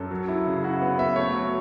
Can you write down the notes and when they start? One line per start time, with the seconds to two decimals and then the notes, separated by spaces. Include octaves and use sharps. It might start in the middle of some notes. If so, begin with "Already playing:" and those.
Already playing: F#2 A4
0.11 F#3
0.28 E4
0.46 C#3
0.63 E4 F#4
0.82 B3
0.98 B3 E5
1.16 A3 C#5
1.34 F#3